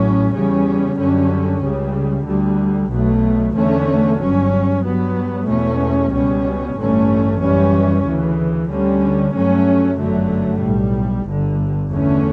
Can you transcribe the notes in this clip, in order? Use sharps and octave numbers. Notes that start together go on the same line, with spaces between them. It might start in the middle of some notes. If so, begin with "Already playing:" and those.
Already playing: A1 A2 F#3 C#4
E2 C#3 G3 C#4
F#2 D3 G3 C#4
C#2 C#3 G3
D2 D3 G3
B1 B2 F#3 A3
E2 D3 A3 C#4
G1 G2 F#3 C#4
G2 F#3 B3
E2 B2 A3 C#4
C#2 B2 G3 C#4
A1 G2 D3 A3 C#4
F#2 E3 G3 C#4
D2 C#3 E3
D2 D3 G3 C#4
G2 F#3 A3 C#4
G1 F#2 D3 F#3 A3
B1 A2 G3
G1 G2 D3
E2 D3 A3 C#4